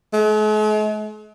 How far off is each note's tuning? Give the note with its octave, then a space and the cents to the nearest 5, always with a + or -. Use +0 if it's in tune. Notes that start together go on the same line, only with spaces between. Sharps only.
G#3 +45